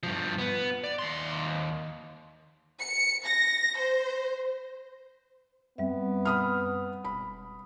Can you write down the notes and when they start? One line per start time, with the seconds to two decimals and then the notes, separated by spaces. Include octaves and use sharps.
0.03 G2 F3
0.38 B3
0.84 D5
0.99 D#2 C6
2.82 C#7
3.27 A#6
3.79 C5
5.78 F#2 G3 B3 C4 E5
6.25 B5 D#6 F6
7.04 E1 B5